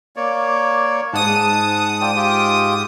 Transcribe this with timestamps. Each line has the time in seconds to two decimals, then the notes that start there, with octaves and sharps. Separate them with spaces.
0.16 A#3 C#5 D5
1.13 G#2 F#5 A5 D#6
2.01 F4 D5 G5
2.16 F4 G4 G5